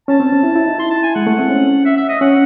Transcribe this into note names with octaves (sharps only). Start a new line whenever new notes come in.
C#4 A5
C4
C#4
E4
E4
D#4
E4 C6
A5
G#5
G#3 F#5
A3
C4
C#4
E5
E5
D#5
C#4 F#5